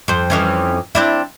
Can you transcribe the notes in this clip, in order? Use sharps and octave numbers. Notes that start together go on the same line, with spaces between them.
F2 C5
F2 E3 C#4
C4 D4 E4